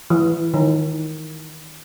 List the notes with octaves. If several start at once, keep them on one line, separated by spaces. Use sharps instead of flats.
E3
D#3